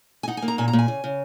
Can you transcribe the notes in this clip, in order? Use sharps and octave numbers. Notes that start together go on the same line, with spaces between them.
G#5
D#4 F#5
G#5
A#3
A#5
A#2 G#5
A#5
A#2
G#5
C#3
C#3